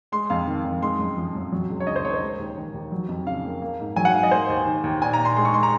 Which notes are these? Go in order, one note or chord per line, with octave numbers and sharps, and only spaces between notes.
G#3 C6
F2 F5
D#3
F2
G#3 C6
F#2
F3
F#2
F#3
C#2
C#5
C#3 D#5
C5
A#3 C#5
C5
G#3
D#2
D#3
D#2
F#3
F2
C#3 F5
A#3
A#3
G#2
F#3 G#5
F#5
G#2 F5
D#5
A#3 C5
D#2
D#3
D#2
A#2 G#5
A#5
A#2
C6
G#3 C6
C#6
G#3 C6
A#5